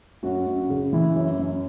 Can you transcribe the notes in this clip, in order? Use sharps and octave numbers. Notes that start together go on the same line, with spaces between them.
F#2 F#4
F#2
C#3
E3 E4
F#2
F#2